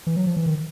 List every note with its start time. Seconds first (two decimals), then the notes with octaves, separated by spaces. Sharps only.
0.07 E3
0.16 F#3
0.27 F3
0.37 E3
0.46 D#3